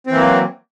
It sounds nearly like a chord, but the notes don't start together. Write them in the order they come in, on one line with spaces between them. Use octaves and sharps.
C4 E3 A#3 F#3